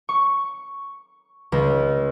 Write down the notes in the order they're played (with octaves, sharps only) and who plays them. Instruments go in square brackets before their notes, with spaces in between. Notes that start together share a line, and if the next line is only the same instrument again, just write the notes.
[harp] C#6
C#2